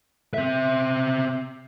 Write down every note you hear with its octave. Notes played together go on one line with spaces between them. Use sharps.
C4 E5